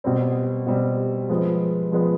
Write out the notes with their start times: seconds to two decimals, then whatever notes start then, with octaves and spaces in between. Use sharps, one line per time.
0.04 B2 G3 C4
0.67 B2 G3 C4
1.29 F3 G#3 B3
1.92 F3 G#3 B3